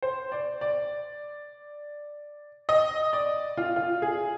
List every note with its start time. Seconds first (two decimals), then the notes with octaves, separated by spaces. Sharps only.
0.02 C5
0.32 D5
0.61 D5
2.69 D#5
3.13 D5
3.57 F4
3.76 F4
4.02 G#4